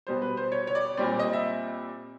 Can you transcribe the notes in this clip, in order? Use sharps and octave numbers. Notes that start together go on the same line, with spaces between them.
B2 G3 B3 C5
B4
C5
C#5
C#5
D5
A#2 G3 C4 D5
D#5
E5